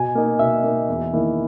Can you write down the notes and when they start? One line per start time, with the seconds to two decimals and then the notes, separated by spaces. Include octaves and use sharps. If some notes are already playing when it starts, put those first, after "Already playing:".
Already playing: B2 G#5
0.15 A#3 D#4
0.39 B2 E5
0.64 A#3 D#4
0.89 E2
1.13 D#3 A#3 E4